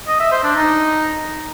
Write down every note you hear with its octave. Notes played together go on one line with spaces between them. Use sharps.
D#5
E5
C5
D4
D#4